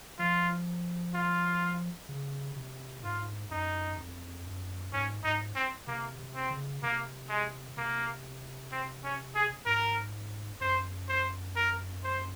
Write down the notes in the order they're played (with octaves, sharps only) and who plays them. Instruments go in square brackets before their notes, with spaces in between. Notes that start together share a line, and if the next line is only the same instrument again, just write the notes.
[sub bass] F3 [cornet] F4
[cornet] F4
[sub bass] C#3
C3
[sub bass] G#2 [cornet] F4
[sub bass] F#2 [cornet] D#4
[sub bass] F2
F#2
[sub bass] G#2 [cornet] C#4
[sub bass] G#2 [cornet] D#4
[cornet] C4
[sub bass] C3 [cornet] A#3
[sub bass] C3
[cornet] C4
[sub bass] C#3
[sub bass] C3 [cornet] A#3
[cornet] G#3
[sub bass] C3 [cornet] A#3
[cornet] C4
C#4
G#4
[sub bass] G#2 [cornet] A#4
[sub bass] F#2 [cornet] C5
[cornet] C5
A#4
C5